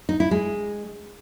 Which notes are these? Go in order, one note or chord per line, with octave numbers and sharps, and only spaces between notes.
D#4
E4
G#3